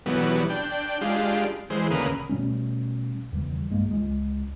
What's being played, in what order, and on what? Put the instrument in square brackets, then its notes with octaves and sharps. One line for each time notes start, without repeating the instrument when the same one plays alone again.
[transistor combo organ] B2 E3 F#3 G3 B3
D4 G5
G#3 D4 F4 G4
E3 G#3 C5
D2 A#2 C#3 A#4 B4 D#6
[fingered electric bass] B2 G3 A3 C#4
D#1 E2 C#3 G3
B1 G2 G#3 A#3
C#2 G#3